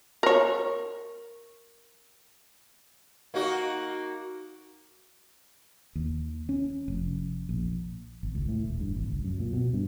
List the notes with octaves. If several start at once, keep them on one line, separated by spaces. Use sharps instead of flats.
A#4 C#5
A#3 D#4 F#4
D#2
C#4
F1
A#1
G#1
C#2
A2
D#1
G2
G#1
C#2
F#2
A#2
B2
G2